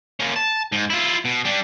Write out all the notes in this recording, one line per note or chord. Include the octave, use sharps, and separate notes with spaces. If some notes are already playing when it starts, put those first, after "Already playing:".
A#3 C#4
A5
G#2
E4 F4
B2
G3 D4